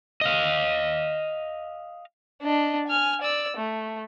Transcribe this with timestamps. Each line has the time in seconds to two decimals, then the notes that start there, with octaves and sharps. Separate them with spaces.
0.21 D#5 F5
2.42 D4 D#5
2.88 G#5 F6
3.21 D5 E6
3.57 A3